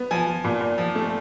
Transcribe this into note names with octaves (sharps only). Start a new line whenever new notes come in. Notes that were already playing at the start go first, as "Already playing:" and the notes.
Already playing: B3
F3 G#5
F3
A#2
A#2
F3
A3